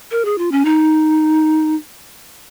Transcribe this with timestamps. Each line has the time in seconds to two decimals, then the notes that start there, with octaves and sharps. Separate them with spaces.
0.11 A#4
0.25 G#4
0.38 F4
0.52 C#4
0.65 D#4